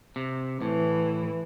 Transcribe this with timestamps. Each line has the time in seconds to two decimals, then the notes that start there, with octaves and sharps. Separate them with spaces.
0.16 C3
0.62 A2 E3